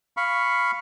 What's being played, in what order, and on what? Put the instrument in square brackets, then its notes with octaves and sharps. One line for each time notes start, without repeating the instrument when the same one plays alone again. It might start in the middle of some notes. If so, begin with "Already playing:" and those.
[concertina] F5 B5 C#6